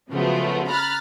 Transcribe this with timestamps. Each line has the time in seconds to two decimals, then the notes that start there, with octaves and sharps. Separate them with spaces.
0.10 C#3 F3 F#3 G#3 A3 B3
0.69 A#5 B5 F6 F#6 A6